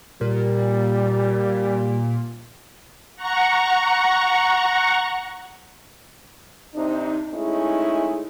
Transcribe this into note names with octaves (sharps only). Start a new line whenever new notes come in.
A#2 G3
F#5 A#5 C#6
C3 C4 D4 D#4
G#3 A3 C#4 D#4 E4 G#4